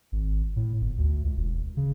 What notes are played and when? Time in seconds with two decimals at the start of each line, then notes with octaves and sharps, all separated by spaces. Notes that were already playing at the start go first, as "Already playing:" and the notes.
0.12 G#1
0.56 A2
0.81 G1
0.98 D2
1.24 C#2
1.36 E1
1.77 C#3